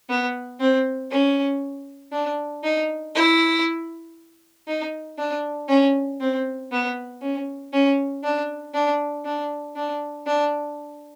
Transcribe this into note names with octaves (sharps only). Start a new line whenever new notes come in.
B3
C4
C#4
D4
D#4
E4
D#4
D4
C#4
C4
B3
C#4
C#4
D4
D4
D4
D4
D4